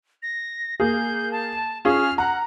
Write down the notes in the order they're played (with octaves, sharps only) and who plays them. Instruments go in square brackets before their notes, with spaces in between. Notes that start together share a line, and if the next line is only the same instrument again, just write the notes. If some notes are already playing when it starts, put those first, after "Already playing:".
[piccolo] A#6
[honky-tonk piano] A#3 G#4 [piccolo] G6
[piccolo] A5
[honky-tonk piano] C#4 F4 G#4 [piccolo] F6
[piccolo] F#5 [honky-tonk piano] A#5